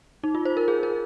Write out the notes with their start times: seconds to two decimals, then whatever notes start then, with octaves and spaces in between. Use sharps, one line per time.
0.24 D#4
0.35 F4
0.45 C5
0.57 A#4
0.68 G#4
0.83 A#4